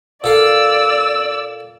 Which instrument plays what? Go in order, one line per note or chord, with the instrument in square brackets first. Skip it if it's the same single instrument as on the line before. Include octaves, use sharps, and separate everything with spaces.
[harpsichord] A#2 A4 F5 [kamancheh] D5 E6